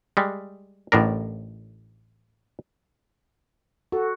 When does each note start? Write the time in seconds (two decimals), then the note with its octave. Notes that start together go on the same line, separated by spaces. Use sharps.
0.17 G3 G#3
0.92 A1 A2 D4 A#4
3.92 F#4 A4